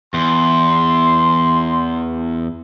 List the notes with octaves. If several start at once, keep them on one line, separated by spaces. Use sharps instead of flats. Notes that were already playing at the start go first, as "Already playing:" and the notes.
E2 C6